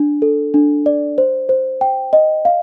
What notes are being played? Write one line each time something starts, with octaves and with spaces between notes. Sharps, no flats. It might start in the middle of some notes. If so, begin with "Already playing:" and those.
Already playing: D4
A4
D4
D5
C5
C5
G5
D#5
F5